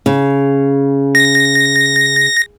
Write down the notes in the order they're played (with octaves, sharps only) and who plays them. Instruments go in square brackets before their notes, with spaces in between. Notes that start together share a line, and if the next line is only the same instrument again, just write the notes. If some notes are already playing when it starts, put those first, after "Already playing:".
[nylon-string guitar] C#3
[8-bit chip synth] A#6